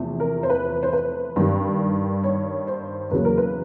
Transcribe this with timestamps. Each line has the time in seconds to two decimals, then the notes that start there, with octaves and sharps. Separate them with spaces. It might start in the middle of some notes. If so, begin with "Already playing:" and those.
Already playing: E2 C3 F3 A3
0.20 A#4
0.43 C5
0.50 B4
0.83 C5
0.93 B4
1.36 G2 D#3 G3
2.24 C#5
2.67 C5
3.11 E2 C#3 F#3 A#3 B4
3.25 A#4
3.37 B4